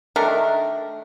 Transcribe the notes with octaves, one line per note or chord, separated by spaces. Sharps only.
D#3 A3 D4 A#4